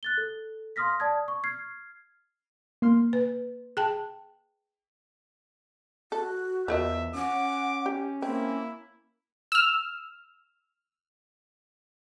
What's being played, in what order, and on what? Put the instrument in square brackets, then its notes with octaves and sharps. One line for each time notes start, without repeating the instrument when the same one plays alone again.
[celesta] F#6 A6 G7
A4
F5 C6 D#6 F6 A#6 B6
D5 A5 D#6 G#6
C#6
F6 G#6 C7
[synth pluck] A#3 C6 F6
[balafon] B4
G#4 G5 A5
[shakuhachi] F#4 [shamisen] A4
[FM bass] E2 [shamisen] F3 A#4 D#5 [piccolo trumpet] E5
[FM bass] C#4 [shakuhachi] F#5 [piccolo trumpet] D6
[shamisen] G4
[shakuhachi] A#3 [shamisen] C4 [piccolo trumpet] E4
[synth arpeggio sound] E6 F6